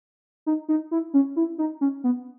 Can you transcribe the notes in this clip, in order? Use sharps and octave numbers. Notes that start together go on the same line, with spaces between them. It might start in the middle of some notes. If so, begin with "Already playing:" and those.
D#4
D#4
E4
C#4
E4
D#4
C#4
B3